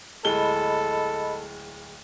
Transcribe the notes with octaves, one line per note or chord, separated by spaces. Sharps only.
D1 G#3 A4 D#5 B5 G7